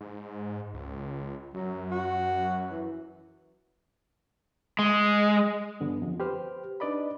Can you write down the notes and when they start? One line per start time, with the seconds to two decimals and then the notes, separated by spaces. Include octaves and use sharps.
0.01 G#2
0.74 C#2
1.54 F#2 F#3
1.91 F#4
2.71 E3
4.79 G#3
5.80 G2 D3 B3
6.02 F2
6.20 G4 B4 C5 F6
6.80 D4 D#4 B4 D5 D#5 B5